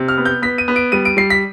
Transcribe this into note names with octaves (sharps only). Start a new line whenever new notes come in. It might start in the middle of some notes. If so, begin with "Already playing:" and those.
Already playing: C3
F6
B3
G6
B3 B6
D#7
B3
D7
G3 D#7
D7
G3 C7
B6